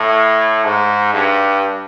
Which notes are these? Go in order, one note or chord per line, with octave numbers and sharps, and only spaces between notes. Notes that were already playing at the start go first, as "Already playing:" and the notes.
Already playing: A2
G#2
G2